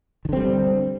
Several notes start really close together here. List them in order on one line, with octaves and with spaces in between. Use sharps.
D#3 D3 C4 G3